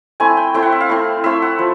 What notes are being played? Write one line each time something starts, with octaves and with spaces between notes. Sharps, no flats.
A3 C4 E4 G#5
G5
A3 C4 E4 G5
F#5
E5
F5
A3 C4 E4
A3 C4 E4 E5
F#5
F3